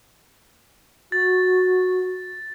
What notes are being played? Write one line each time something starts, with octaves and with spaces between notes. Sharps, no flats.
F#4 A6